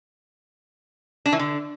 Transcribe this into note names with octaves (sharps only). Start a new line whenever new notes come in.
D4
E3
D3